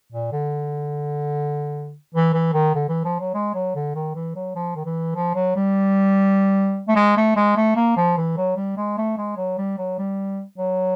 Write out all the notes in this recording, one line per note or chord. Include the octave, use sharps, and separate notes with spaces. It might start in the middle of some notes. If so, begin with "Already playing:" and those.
A#2
D3
E3
E3
D#3
D3
E3
F3
F#3
G#3
F#3
D3
D#3
E3
F#3
F3
D#3
E3
F3
F#3
G3
A3
G#3
A3
G#3
A3
A#3
F3
E3
F#3
G3
G#3
A3
G#3
F#3
G3
F#3
G3
F#3